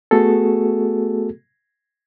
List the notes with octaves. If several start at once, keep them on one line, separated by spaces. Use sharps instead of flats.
A3 B3 F#4 G#4 A4